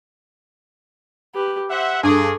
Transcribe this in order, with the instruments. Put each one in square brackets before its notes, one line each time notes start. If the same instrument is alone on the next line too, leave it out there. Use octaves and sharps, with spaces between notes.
[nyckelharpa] G4 B4
[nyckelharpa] C5 [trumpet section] E5 F#5
[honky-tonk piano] G2 [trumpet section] G#4 [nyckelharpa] A4 D6